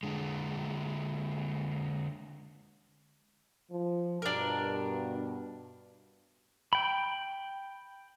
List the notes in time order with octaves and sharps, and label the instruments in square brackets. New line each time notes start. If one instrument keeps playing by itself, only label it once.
[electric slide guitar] D3 G#3
[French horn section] F3
[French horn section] G2 B2 [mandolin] D4 A#4
[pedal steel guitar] G5 B5